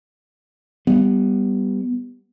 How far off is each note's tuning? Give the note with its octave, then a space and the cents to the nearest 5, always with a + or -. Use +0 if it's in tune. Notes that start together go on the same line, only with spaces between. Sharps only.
G3 +0 B3 +0